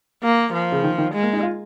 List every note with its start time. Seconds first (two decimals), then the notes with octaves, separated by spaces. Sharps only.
0.23 A#3
0.53 F3
0.72 C#3
0.83 D#3
0.98 D#3
1.13 G#3
1.23 A#3
1.33 D#4
1.43 F4